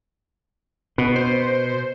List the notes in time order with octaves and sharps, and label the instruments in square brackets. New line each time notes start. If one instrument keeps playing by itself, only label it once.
[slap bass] B2 [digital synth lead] B3
[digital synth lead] C5